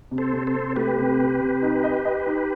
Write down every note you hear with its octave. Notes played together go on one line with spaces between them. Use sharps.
C3
A4 C5
C3
A4 C5
C3
A3 G4 B4
C3
C3
C3
D#4
D#5
D#5
D#4